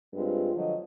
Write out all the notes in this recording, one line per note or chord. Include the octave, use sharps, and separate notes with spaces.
G2 G#3 C4 F4
D3 F3 F#3 D#5